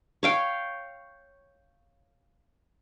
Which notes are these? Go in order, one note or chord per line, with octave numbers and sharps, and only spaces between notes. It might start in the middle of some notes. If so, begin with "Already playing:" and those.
C#5 F5 G5